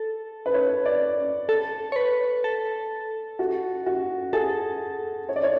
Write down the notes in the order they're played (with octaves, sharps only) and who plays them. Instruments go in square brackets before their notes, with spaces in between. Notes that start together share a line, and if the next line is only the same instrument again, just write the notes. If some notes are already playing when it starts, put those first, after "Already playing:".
Already playing: [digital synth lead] A4
[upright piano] B4
C#5
D5
[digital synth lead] A4
C#5
B4
A4
[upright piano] F#4
F#4
[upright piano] G#4 [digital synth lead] A4
[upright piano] C#5
D5
C#5